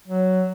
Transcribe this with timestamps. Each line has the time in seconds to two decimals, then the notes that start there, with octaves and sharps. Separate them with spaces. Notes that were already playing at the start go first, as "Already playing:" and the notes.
0.08 F#3